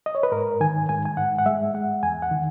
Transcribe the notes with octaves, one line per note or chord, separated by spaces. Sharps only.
D#5
C#5
B4
G#2 A#4
D#3 G#5
G#2 G#5
G#5
G#2 F#5
F#5
G#3 E5
G#3 F#5
E2 G#5
F#5
D#3